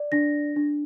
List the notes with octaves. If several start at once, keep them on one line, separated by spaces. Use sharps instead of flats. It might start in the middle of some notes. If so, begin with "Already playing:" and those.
Already playing: D5
D4 A#6
D4